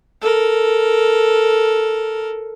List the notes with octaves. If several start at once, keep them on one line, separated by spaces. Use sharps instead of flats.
A4 A#4